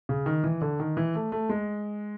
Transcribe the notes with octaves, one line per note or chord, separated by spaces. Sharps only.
C#3
D#3
E3
D3
D#3
E3
A3
A3
G#3